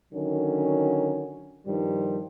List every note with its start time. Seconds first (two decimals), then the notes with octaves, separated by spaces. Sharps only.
0.13 D3 D#3 F#3 C#4
1.66 G2 D#3 F3 G3